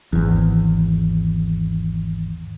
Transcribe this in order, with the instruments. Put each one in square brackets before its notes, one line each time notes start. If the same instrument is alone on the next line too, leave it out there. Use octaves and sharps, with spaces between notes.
[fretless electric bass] G#1 E2